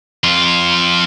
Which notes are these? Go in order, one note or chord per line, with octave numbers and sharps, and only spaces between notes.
F2 F4